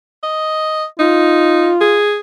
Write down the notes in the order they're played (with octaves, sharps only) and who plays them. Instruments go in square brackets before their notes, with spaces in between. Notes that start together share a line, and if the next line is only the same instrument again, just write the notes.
[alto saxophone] D#5
[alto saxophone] D#4 [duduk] F4
[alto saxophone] G#4